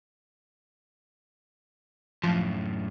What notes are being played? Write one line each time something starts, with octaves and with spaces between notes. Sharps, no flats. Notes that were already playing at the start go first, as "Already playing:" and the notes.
F#2 A2 F3